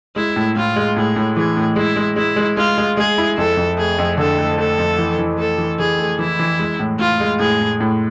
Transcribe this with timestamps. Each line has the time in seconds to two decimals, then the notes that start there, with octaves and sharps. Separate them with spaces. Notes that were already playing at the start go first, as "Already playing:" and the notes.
0.16 G#3 E4
0.36 A2
0.56 A2 F4
0.76 G#3
0.96 A2 G#4
1.16 A2
1.36 E3 G#4
1.57 A2
1.76 G#3 E4
1.96 G#3
2.16 G#3 E4
2.36 G#3
2.57 G#3 F4
2.78 G#3
2.97 G#3 G#4
3.18 E4
3.37 F2 A4
3.57 F2
3.78 A3 G#4
3.98 F2
4.17 D3 A4
4.38 A3
4.58 A3 A4
4.79 F2
4.98 E3
5.19 E3
5.38 A3 A4
5.58 E3
5.79 E3 G#4
5.99 A3
6.19 E3 E4
6.39 E3
6.59 G#3
6.80 A2
6.99 A2 F4
7.20 G#3
7.39 A2 G#4
7.60 A2
7.80 A2